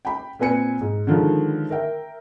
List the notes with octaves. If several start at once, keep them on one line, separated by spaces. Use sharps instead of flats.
G5 B5
A#2 C4 B4 G#5 C#7
G#2
D3 D#3 F3 G#3
A#4 E5 G5